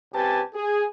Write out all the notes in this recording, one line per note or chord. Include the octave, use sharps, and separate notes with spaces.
C#2 C4 G4 B4 G#5 A5
G#4